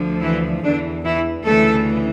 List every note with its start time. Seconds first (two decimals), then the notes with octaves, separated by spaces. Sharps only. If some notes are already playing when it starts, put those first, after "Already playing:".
Already playing: D2 D3 F3
0.21 E3 E4
0.63 E2 D3 E3 D4
1.04 E3 E4
1.46 D2 C#3 E3 A3 A4